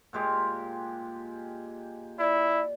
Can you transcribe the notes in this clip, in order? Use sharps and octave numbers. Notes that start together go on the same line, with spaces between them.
A#2 G#3 G4
E4 D5